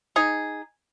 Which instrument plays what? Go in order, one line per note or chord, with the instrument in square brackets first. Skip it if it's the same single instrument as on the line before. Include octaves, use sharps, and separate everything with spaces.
[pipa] D#4 G#4